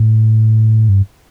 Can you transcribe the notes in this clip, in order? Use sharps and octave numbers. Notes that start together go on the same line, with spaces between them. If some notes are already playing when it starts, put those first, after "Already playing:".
Already playing: A2
G2